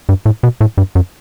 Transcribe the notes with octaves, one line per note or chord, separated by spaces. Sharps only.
G2
A2
B2
A2
G2
F#2